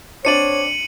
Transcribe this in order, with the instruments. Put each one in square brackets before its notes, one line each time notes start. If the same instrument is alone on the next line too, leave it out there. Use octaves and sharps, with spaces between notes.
[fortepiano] C4 D4 D5 [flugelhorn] C#5 [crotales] C#7 D#7 F#7